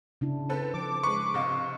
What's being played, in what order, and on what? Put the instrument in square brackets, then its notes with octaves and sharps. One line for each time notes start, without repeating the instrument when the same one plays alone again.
[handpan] C#3 D4 E4
[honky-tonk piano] C4 A4 [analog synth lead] B4
[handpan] F3 [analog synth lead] D6
[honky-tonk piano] G#3 B4 [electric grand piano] C#6
[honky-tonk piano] C3 D#5 F5